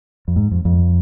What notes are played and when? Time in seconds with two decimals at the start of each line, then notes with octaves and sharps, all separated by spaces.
0.28 F2
0.36 G#2
0.51 F2
0.65 F2